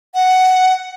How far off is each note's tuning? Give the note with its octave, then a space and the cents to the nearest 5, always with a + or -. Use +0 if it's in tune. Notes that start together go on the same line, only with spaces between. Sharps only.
F#5 +5